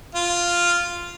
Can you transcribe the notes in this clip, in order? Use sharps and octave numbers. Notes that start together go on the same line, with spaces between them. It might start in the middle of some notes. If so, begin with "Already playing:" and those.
F4 F5